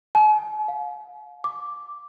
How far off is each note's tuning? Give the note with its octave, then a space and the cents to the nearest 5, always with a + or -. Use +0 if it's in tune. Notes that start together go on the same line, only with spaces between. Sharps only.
G#5 +45
F5 +45
D6 -5